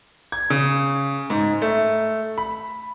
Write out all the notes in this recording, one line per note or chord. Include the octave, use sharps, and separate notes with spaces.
G#6
C#3
G#2
A3
B5